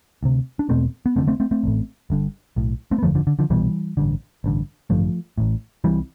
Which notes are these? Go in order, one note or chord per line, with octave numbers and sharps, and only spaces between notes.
D2 C3
D4
E1 E2 B2 A3 C4
B3
F1 E2 D3 A3 C4
A3 C4
A3 C4
A3 C4
A1 A2
G1 G2 D3
B1 A2
A3 C4
B3
G1 F2 D3 F3 A3
D3 F3
D3
D3 F3
C2 B2 E3 G3
A1 G2 D3
A1 G2 D3
A1 G2 D3 F3 A3
A1 A2
C2 C3 E3 G3